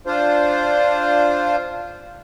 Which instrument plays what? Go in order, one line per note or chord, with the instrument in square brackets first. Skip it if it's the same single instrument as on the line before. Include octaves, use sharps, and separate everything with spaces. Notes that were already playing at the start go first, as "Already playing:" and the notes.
[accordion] D4 F4 C5